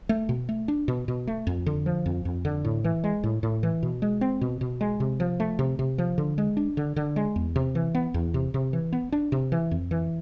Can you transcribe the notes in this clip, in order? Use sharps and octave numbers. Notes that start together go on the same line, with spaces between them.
A3
B2
A3
D4
B2
B2
A3
F2
D3
F3
F2
F2
D3
A2
E3
G#3
A2
A2
E3
B2
G#3
C4
B2
B2
G#3
C3
F3
A3
C3
C3
F3
D3
G#3
D4
D3
D3
G#3
E2
C3
E3
B3
E2
C3
C3
E3
B3
D4
C3
E3
F2
E3